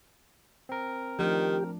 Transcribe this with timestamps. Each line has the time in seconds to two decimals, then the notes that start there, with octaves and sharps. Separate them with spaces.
0.69 C4 A#4
1.19 D#3 F3 A3 D4 G4